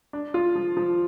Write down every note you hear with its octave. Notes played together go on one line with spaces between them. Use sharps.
D4
F4
F3
F3